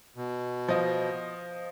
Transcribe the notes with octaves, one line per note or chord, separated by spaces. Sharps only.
B2
F3 D#5